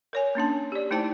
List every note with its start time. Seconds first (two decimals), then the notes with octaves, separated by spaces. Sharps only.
0.13 A#4 C#5 G#5
0.35 A#3 C#4 D4 A5
0.72 G4 D5
0.91 A3 D#4 E4 C5 G5 A5